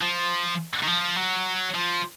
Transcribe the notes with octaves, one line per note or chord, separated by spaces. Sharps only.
F3
D#3
F3
F#3
F3